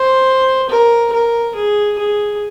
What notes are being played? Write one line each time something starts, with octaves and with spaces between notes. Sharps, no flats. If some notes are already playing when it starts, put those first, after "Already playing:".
Already playing: C5
A#4
A#4
G#4
G#4